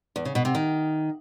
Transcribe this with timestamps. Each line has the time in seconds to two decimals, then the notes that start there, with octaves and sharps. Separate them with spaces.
0.16 E2
0.25 C#3
0.35 B2
0.45 C3
0.55 D#3